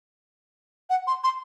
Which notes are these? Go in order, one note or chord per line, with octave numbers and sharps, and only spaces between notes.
F#5
C6
C6